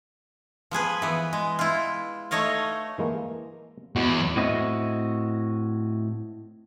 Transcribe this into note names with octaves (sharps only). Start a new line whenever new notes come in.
F3 B3 G#4 B4
E3 B3
G#3
E4 F4
A3 D#4 C#5 D#5 F5
E3 G#3 A#3
E2 G#3 F#4
A2 C4 E4 F#4 D#5